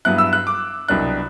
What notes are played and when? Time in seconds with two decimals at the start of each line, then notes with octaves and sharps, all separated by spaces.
0.05 G2 F#3 B3 E4 F#6
0.18 E6
0.33 F#6
0.47 D6
0.89 C2 B2 F#3 B3 D4 F#6